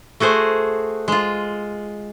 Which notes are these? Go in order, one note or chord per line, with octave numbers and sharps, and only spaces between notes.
A3 F#4 G#4 C5
G#3 F4